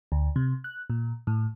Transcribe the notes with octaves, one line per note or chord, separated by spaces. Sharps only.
D2
C3
F#6
A#2
A2